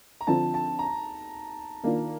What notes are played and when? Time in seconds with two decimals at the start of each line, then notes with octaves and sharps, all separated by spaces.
0.21 A#5
0.27 D3 F3 C4 F4 A5
0.54 A5
0.79 A#5
1.83 D#3 A#3 D4 F4